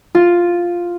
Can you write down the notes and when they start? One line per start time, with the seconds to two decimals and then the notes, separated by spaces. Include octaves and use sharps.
0.15 F4